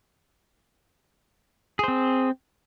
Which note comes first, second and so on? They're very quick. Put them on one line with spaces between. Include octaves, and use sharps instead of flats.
G#4 C5 C4